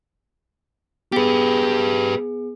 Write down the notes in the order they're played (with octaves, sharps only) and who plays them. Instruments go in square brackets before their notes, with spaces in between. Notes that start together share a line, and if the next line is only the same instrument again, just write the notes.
[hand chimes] B3 G#4 [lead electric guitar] G4 B4